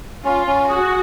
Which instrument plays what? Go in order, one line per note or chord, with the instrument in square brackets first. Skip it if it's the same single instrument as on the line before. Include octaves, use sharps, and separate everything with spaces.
[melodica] C#4 [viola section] F4
[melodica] C#4
[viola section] F#4 [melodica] G#4